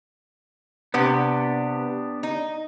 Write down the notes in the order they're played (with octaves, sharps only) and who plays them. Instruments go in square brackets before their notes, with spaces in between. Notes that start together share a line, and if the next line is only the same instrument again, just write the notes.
[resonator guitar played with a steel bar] C3 B4 F#5 [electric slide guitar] B3 D4 G4
[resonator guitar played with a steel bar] D#4